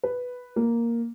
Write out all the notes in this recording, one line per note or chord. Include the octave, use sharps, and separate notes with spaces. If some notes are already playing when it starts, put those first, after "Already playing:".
B4
A#3